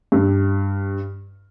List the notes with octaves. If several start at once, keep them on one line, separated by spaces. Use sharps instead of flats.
G2